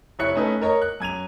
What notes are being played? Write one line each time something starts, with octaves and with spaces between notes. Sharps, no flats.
F1 E4 C#5 F#6 C#7
A3 C#4 D#4 B4
A#4 C#5 D#5 A#5
F#6
F#2 G#6 D#7 F7